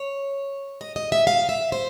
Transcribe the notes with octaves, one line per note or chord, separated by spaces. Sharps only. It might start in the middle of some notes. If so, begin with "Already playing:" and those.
Already playing: C#5
D#5
D#5
E5
F5
E5
C5